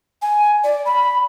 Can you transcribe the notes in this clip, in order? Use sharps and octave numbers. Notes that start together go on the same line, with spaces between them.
G#5
D5
B5